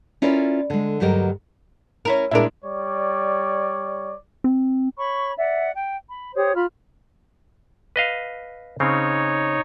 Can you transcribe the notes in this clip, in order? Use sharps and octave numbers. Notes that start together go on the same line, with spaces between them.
C#4 E4 F4 A#4 C#5 D5
D3 G#3
D2 G2 F#3 G4 A#4 D#5
C#4 E4 A#4
A#2 G#3 D4 E4 A#4
G3 C#5 D5
C4
C#5 B5 C#6
D5 E5 F#5
G5
B5
G4 C5 C#5 D#6
F4 B5 F6
B4 D#5 F5
C#3 C4 D#4 C#5